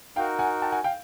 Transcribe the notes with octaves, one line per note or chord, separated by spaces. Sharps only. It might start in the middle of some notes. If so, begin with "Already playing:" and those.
D#4 F#4 A#4 F5 G5
F#5 G#5
G5 A5
F#5 G#5
F5 G5